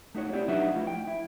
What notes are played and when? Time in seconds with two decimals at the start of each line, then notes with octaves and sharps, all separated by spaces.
0.15 A3 D#4 F#4 C#5
0.33 C4 E4 G4 D5
0.48 F#3 D4 D#4 F#4 B4 E5
0.75 F3 A3 E4 F4
0.87 G5
1.07 E4